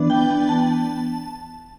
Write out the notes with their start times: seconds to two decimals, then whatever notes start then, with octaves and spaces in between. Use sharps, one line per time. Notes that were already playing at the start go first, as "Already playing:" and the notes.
Already playing: E3 B3 D4
0.10 G5
0.30 G5
0.49 A5